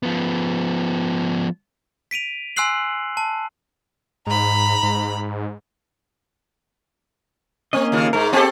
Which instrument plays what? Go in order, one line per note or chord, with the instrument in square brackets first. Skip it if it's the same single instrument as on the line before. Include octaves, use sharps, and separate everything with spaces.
[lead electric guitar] F3 B3
[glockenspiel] B6 D7 D#7 F7
G#5 C6 E6 F#6 C7 F#7
A5
[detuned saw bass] G#2 [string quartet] A#5 B5
[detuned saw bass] G#2
[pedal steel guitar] A#3 C#4 D#5 [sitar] C4
[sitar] D#2 C#3 F4
[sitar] G#2 G#3 [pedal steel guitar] A#4
[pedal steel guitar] B3 D#5 A5 [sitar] C4 G4 A4